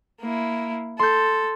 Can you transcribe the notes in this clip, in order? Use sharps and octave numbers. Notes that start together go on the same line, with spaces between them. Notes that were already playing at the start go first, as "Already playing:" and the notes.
A#3 E4
A4 C6 G6